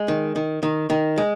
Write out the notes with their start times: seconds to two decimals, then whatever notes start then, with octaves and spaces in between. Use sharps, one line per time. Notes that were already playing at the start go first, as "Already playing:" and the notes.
Already playing: G#3
0.08 D#3
0.36 D#3
0.63 D#3
0.90 D#3
1.18 G#3